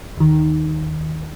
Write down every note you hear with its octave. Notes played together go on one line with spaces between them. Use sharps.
D#2 D#3